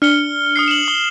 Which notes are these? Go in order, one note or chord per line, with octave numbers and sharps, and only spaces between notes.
D4 F6 C#7 G7
D#6 F6 C7
E7 F#7
D#6 G7